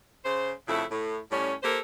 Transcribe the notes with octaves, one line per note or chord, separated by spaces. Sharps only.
C#3 C5
F2 C#3 A3 E4
A2
A2 G3 C#4
A#3 G4 A4 A#4 C5